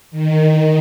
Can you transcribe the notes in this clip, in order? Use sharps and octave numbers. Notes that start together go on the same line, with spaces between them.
D#3